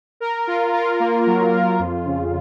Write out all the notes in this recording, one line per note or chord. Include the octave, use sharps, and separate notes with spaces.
A#4
F4
F4
A#3
F#3
F4
F2
C#3